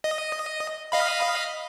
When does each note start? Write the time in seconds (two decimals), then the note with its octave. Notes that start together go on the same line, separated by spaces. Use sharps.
0.04 D#5
0.92 D#5 F5 B5